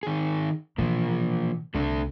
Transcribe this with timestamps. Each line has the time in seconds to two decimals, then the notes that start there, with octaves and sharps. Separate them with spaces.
0.03 D#3 G#4
0.78 B2 E3 F3 A#3
1.74 C2 A3 D4 A4